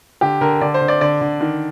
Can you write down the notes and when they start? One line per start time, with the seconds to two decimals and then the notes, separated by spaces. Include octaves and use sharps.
0.21 D3 G4
0.41 D3 A#4
0.61 D3 D5
0.74 C5
0.81 D3
0.88 D5
1.01 D3 D5
1.21 D3
1.41 D#3